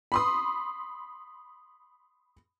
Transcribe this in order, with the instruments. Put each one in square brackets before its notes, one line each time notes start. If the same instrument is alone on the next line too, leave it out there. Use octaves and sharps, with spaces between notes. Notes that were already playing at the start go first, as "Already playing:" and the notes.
[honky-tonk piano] B5 C6 D#6